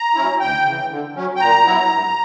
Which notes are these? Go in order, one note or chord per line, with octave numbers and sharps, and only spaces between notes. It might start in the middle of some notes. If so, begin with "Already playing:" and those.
Already playing: A#5
F#3 C#4 E4
D2 G5
C#3 E3
D3
F#3 C#4
G5
A#2 A#5
F#3 B3 E4
G2